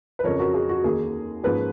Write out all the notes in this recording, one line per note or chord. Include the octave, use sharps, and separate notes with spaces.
B4
F2 C#3 F3 A#4 C#5
F#4 A#4
G#4
F#4
D#2 D#3 A#3 G#4
G#2 F3 A#3 C#4 G#4 B4